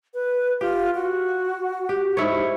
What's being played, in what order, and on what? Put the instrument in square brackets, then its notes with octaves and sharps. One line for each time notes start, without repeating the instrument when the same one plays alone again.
[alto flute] B4
[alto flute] F4 [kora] G4
[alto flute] F#4
[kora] G4
G#2 E4 C#5